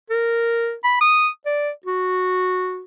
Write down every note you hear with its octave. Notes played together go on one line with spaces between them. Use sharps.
A#4
B5
D#6
D5
F#4